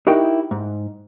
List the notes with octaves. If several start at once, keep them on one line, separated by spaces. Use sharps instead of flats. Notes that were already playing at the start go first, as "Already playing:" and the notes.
D#4 E4 F#4 G4 A#4 G5
G#2